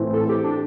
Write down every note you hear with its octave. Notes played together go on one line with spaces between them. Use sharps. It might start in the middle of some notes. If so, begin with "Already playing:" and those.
Already playing: A2 E3 C4
A4
G4
D4